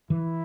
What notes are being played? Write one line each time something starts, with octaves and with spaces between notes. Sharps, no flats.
E3 E4